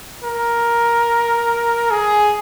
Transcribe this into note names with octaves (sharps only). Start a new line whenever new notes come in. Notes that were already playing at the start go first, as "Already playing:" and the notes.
A#4
G#4